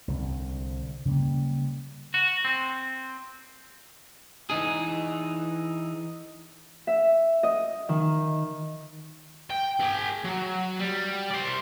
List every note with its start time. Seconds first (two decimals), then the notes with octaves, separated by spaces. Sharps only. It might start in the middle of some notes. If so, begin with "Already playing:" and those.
0.08 C2 D3
1.05 C#3 F#3 G3 A#3
2.14 F#4
2.45 C4
4.50 E3 D#4 G#4
6.87 E5
7.43 D#5
7.89 D#3
9.50 G5
9.80 G#4 G5
10.25 F#3
10.80 G3
11.31 C5 D5